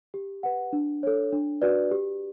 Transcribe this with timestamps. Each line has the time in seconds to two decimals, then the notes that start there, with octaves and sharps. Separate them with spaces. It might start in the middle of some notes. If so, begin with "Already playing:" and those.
0.14 G4
0.43 B4 F#5
0.73 D4
1.03 A4 C#5
1.32 D4
1.62 F#4 B4 D5
1.91 G4